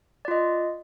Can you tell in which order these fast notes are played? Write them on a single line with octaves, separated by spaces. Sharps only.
D5 F4 D#5